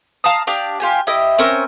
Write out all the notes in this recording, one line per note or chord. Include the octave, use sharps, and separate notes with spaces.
F5 A5 A#5 D#6
D4 G4 F5 D#6
F4 G4 G#5
E4 G4 D#5
C4 C#4 A#4